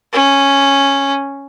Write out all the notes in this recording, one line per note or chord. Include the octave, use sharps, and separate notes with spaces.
C#4